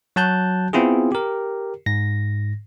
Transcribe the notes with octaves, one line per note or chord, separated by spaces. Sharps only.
F#3 F#4 A5 F#6 G6
B3 C4 E4 F4 G#4
G4 A#4
G#2 A#6